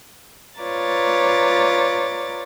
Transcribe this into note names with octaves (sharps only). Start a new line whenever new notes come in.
F4 B4 C#5 D5 A#5 A6